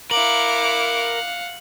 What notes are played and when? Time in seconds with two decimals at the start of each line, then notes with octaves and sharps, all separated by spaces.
0.11 E4 A#4 F5 F#5 D6 F#7